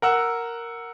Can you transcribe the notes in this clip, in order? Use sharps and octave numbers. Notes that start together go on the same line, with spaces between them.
A#4 F#5 E6